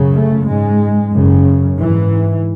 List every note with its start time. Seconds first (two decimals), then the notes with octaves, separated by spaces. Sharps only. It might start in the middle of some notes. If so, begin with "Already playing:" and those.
Already playing: F#2 C#3
0.15 A3
0.47 G#2 G#3
1.13 F#2 C#3
1.78 G#2 E3